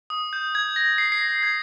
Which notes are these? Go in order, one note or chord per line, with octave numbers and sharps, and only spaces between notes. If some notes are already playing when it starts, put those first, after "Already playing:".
D#6
G6
G#6
A#6
C7
C7
A#6
G#6